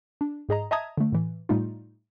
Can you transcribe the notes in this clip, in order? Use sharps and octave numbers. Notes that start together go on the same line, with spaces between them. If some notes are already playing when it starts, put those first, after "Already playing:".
D4
G#2 G#4 D#5 A#5
D#5 E5 A5 A#5 D#6 G#6
D3 A3
A2 E3
A2 G3 A3 D#4 F4